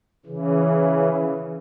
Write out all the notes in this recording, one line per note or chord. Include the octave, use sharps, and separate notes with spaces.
C#3 E3